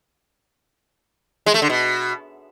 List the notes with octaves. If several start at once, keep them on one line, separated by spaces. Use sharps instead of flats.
G#3
A3
D3
B2